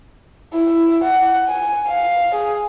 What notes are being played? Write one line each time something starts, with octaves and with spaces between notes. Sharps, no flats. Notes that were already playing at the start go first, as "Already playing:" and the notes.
E4
F#5
G#5
F5
G#4